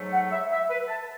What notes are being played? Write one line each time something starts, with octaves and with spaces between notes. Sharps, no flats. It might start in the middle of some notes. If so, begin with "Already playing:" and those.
Already playing: G#2 F#3 A3
F#5
E5
E5
B4
A5